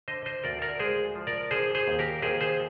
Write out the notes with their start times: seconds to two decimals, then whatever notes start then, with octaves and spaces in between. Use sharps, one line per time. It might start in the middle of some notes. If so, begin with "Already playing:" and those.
0.08 D3 C5 D#5
0.26 C5 D#5
0.44 D2 A#4 D5
0.62 A#4 D5
0.79 G#3 G#4 C5
1.15 F3
1.27 A#4 D5
1.51 D3 G#4 C5
1.75 G#4 C5
1.87 D#2
1.99 G4 A#4
2.22 D#2 G#4 C5
2.41 G#4 C5